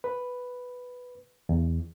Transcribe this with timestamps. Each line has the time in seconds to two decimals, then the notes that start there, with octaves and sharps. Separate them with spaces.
0.04 B4
1.49 E2